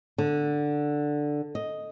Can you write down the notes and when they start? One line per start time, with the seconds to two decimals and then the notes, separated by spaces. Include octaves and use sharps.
0.18 D3
1.55 D#5